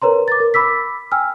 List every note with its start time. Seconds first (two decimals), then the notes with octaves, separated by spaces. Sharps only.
0.02 A#4 B4 C#5 A#5 C6
0.28 D6 A6
0.40 A#4
0.54 B5 D6 E6 B6
1.12 G5 G#5 E6 F6